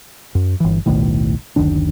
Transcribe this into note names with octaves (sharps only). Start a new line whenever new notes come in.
F#2
G1 E3
D#1 B1 A2 D#3
F#1 D2 D#3 D4